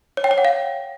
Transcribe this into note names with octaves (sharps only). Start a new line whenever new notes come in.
C#5
G5
C#5
F#5
F5